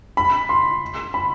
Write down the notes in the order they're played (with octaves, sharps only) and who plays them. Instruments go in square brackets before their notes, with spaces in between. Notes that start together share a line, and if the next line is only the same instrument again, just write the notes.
[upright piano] B5
C6
B5